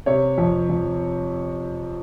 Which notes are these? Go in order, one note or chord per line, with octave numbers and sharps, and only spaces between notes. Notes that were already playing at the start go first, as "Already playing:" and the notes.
C3 C#5
F2
F2